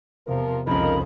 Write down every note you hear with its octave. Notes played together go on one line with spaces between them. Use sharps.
E2 C3 F3 A#4
C2 F2 C#3 F3 D#4 A#4 B5